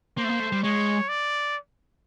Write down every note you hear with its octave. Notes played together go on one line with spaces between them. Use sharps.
A#3 C5
A3
A#3
A3
G3
G#3 C#5
D5